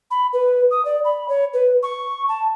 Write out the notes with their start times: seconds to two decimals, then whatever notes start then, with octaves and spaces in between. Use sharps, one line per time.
0.11 B5
0.33 B4
0.71 D#6
0.85 D5
1.05 B5
1.29 C#5
1.53 B4
1.83 C#6
2.28 A5